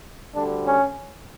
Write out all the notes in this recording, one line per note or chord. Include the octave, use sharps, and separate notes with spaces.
D2 D3 G3 D4
C#4